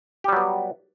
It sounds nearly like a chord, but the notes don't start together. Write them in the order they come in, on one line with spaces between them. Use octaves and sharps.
G4 G3 F#3 B3